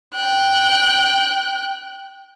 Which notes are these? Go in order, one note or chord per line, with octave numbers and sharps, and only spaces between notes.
G5 F#6